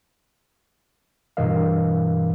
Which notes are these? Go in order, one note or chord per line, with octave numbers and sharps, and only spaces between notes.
G2 B2 E3 A#4 D#5 F5